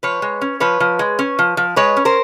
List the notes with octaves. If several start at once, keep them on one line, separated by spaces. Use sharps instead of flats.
F3 B4 C#5
G#3
C#4
F3 B4 C#5
F3
G#3
C#4
F3
F3
G#3 B4 C#5
C#4
A#4 C5